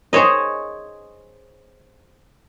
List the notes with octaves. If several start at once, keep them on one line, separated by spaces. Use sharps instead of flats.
G#4 C5 C#5 D#5